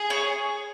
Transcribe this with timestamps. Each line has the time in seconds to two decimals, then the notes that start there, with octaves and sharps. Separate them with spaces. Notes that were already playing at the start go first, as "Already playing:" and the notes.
Already playing: G#4
0.10 C#5